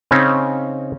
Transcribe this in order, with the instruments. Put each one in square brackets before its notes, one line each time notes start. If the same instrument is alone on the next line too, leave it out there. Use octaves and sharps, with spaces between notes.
[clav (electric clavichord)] C#3 C4 C#4 D#4